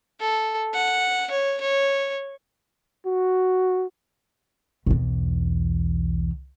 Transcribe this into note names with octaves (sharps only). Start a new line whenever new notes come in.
A4
F#5
C#5
C#5
F#4
B1 E2